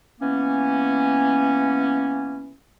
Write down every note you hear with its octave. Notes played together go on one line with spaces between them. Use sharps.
E3 A#3 B3 C#4